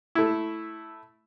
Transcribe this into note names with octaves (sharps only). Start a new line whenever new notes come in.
A3 E4